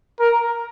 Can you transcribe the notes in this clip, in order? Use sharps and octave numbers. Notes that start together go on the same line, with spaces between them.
A#4